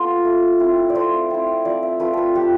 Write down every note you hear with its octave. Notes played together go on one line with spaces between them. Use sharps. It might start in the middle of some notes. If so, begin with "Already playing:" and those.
Already playing: B3 F4 A4
A3
C4 E4
D5
A3 C5
C4 E4
F3 D5
E5
A3 C4 F4 B4
A4 B4
F3 G4